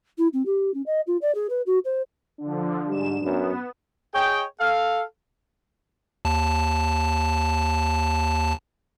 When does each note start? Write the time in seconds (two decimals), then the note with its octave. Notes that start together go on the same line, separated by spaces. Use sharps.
0.18 E4
0.33 C4
0.45 G4
0.74 C#4
0.86 D#5
1.07 F4
1.21 D5
1.34 G#4
1.49 B4
1.66 F#4
1.84 C5
2.40 D3 F3 D4
2.87 G#2 G3 E7
3.22 F#2 B3
4.14 G#4 C#5 D#5 G5
4.60 A4 F5
6.25 D#2 A5